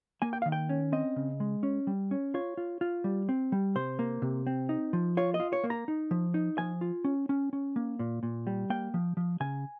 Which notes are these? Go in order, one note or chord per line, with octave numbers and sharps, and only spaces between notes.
A#3 G#5
G5
D#3 F5
G5
C#4
C4 D#5
C#3
G#3
C#4
G3
C#4
F4 C#5
F4
F4
G3
C4
G3
C3 C5
A#3
C3
C4
D#4
F3
F4 C#5
D#5
F4
C#5
A#3
A#5
D#4
F3
D#4
F3 G#5
F4
C#4
C#4
C#4
A#3
A#2
A#2
G3
A#3 G5
F3
F3
C#3 G#5